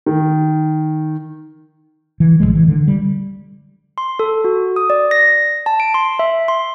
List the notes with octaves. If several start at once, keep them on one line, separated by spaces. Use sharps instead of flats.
D#3
E3
A1 A#2 F3 G#3
E3
D3
G3
C6
A4
F#4
D#6
D5
A#6
A5
D7
C6
E5
C6